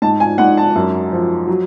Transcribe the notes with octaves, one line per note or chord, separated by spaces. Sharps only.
G#2 A5
G#5
G#2 F#5
A5
F#2
F3
F#3